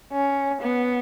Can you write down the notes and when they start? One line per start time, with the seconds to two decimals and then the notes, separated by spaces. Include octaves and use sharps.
0.13 C#4
0.62 B3